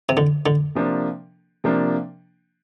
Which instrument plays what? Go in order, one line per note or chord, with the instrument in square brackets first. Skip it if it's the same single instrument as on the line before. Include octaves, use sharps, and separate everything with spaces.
[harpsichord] C3
D3
D3
[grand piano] C3 F3 A#3 D4
C3 F3 A#3 D4